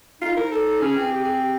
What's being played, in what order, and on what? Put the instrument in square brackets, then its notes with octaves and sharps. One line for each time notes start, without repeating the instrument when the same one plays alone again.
[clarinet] D#4 [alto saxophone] F4
[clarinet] E4
[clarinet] D#4 [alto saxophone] A#4
[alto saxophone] A4
[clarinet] C#4 [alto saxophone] G#4
[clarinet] C4
[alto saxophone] G4
G#4
G4